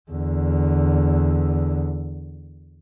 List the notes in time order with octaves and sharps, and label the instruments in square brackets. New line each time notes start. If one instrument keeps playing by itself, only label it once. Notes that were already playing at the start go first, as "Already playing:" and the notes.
[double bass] E2 D3